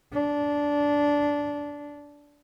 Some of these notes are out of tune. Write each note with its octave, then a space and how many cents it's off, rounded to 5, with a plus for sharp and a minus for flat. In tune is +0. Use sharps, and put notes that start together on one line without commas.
D4 -15